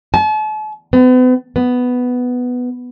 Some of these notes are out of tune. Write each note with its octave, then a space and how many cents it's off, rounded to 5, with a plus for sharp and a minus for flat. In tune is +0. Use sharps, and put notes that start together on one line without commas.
A5 -40
B3 +40
B3 +5